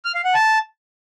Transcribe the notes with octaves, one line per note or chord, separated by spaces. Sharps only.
F6
F5
F#5
A5